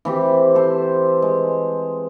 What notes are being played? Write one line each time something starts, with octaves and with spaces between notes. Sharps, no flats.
E3 C4 G4
A4 C5
G#3